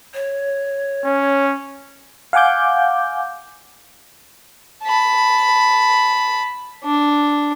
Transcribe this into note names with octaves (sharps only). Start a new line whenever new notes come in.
C#5
C#4
F5 F#5 G#5 D6 G6
A5 B5
D4